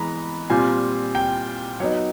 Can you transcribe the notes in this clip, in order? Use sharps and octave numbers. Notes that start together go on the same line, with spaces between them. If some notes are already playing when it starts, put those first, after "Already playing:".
Already playing: E3 G#3 B3 A#5 B5
A#2 G3 C4 F4 G#5
G5
F#3 B3 D#4 C#5